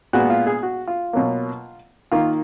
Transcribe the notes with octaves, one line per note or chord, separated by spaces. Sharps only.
A#2 G#3 B3 F#4
F4
G#4
F#4
F4
B2 F#3 A#3
D#3 A#3 F4